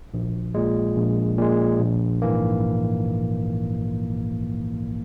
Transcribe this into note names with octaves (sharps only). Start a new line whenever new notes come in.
A#1
A#2 G#3
A#1
A#2 G#3
A#1
G#2 E3 A#3